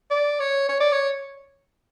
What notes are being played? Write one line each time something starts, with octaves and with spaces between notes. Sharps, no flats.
D5
C#5
C#5
D5
C#5